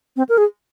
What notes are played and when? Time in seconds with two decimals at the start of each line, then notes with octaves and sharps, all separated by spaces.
0.16 C4
0.29 A#4
0.38 G#4